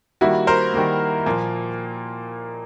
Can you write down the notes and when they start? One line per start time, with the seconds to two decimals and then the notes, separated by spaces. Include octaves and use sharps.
0.21 D#3 G3 A#3 E4 F#4
0.47 A#4 C5
0.74 D#3 G3 A#3
1.26 A#2 F3 A#3